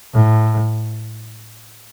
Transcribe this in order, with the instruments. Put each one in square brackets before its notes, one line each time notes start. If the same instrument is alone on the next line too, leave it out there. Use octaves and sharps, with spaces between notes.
[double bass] A2